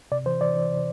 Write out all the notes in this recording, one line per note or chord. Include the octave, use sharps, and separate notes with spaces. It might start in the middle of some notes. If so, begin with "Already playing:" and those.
C3 D5
E3 C5
E3 D5
E3
C3